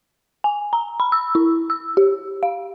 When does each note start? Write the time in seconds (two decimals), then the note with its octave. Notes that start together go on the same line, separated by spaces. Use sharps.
0.44 G#5
0.73 A#5
1.00 B5
1.12 E6
1.35 E4
1.70 E6
1.97 G4
2.43 F5